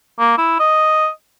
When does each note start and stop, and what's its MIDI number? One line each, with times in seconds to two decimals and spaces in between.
0.19 0.34 58
0.38 0.56 64
0.60 1.09 75